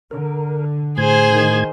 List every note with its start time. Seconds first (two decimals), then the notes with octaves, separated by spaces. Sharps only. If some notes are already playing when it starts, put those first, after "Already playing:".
0.11 D3 A#4
0.98 A2 G#4 C5 G#6
1.33 D#3